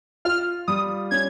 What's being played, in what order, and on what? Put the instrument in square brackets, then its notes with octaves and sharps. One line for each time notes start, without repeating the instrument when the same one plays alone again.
[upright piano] F4 [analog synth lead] F6
[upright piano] G3 [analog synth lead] D#6
[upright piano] C#4 [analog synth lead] G#6